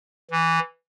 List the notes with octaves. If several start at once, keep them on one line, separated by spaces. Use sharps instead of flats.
E3